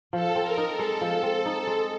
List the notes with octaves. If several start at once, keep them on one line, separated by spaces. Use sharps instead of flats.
F3 A4
C4
A#4
D#4
A4
G#3
F3
C4
D#4
G#3